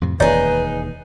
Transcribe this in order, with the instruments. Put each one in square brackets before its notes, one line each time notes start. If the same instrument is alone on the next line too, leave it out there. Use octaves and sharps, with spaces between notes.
[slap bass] F2 A2 C3
[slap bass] E1 D#2 [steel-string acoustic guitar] D#4 G#4 [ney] B4 [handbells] C#5 D5 G6